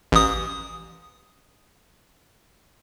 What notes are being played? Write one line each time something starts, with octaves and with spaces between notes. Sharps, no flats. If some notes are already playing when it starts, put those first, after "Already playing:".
A1 D#6